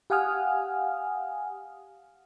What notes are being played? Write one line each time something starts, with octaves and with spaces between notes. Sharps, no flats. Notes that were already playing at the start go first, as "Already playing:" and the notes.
G4 F5 F#5 G#5 D#6 F6